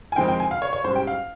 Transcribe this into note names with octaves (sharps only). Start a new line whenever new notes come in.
G#5
F2 D#3 G#3 C4 G5
G5
G#5
F5
C#5
C#5
G#2 G3 C#4 C5
G5
F5